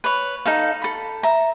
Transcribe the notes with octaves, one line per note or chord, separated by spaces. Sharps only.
B4 C#5
D#4 A4 F5
A4 B5
E5 A#5